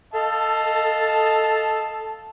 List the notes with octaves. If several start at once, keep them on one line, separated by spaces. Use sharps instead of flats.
A4 D#5 F5 A5